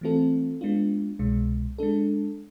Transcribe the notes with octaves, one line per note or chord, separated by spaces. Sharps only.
E3 A3 C4 F4 A4
G#3 B3 D4 F4
C2 B2 G#3
G#3 D4 A4